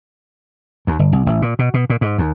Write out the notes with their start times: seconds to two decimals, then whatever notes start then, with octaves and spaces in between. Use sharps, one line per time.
0.87 D#2
0.99 G1
1.13 C2
1.26 A1
1.42 A#2
1.59 B2
1.74 B2
1.90 A#2
2.01 G#2
2.18 D#2